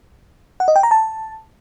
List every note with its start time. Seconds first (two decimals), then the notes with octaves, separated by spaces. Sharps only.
0.60 F#5
0.68 D#5
0.76 G5
0.83 A#5
0.91 A5